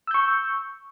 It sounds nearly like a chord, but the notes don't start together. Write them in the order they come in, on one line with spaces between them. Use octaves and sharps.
E6 G6 C#6